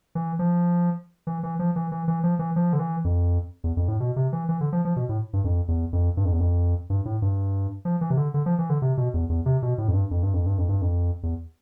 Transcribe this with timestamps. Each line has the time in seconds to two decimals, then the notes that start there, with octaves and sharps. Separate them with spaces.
0.15 E3
0.39 F3
1.27 E3
1.43 E3
1.59 F3
1.76 E3
1.92 E3
2.08 E3
2.23 F3
2.39 E3
2.56 F3
2.73 D3
2.79 E3
3.05 F2
3.64 E2
3.77 F2
3.88 A2
4.00 B2
4.16 C3
4.33 E3
4.49 E3
4.61 D3
4.72 F3
4.85 F3
4.96 B2
5.09 A2
5.33 G2
5.44 F2
5.68 E2
5.93 F2
6.17 G2
6.25 F2
6.33 E2
6.40 F2
6.90 G2
7.05 A2
7.22 G2
7.85 F3
8.01 E3
8.10 C3
8.17 D3
8.34 D3
8.46 F3
8.58 E3
8.70 D3
8.82 C3
8.97 B2
9.14 E2
9.29 E2
9.46 C3
9.62 B2
9.78 A2
9.88 F2
9.94 G2
10.11 F2
10.22 G2
10.34 F2
10.46 G2
10.58 F2
10.69 G2
10.82 F2
11.23 E2